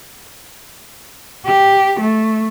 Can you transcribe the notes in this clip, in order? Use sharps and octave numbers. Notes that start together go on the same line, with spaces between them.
G4
A3